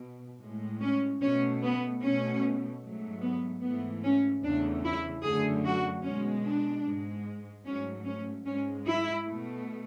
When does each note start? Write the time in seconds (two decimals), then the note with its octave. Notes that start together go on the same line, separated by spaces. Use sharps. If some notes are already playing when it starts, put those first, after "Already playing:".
Already playing: B2
0.41 A2 G#3
0.82 C#4
1.22 B2 A3 C#4
1.62 B3
2.02 B2 A3 C#4
2.82 G#2 F#3 A3
3.22 B3
3.62 G#2 E3 A3 B3
4.02 C#4
4.43 E2 C#3 E3 A3 D4
4.84 E4
5.23 F#2 D3 A3 G#4
5.64 F#4
6.03 B2 G#3 C#4
6.44 D4
6.84 G#2 G#3
7.64 G#2 F#3 A3 C#4
8.05 C#4
8.45 G#2 G#3 C#4
8.85 E4
9.25 B2 A3